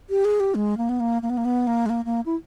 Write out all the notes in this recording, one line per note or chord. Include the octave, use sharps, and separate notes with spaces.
G4
G#4
G4
G#3
A#3
B3
A#3
A#3
B3
A#3
B3
A#3
G#3
A#3
A#3
E4